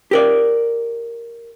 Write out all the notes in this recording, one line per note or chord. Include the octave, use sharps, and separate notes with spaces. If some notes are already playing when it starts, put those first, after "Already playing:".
G4 A#4 D5